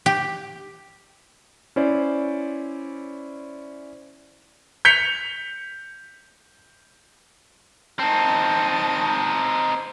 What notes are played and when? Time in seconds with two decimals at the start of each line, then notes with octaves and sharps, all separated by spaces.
0.06 G4
1.76 C#4 E4 C5 D5
4.85 G6 B6 C#7 F7
7.99 C4 D#4 A5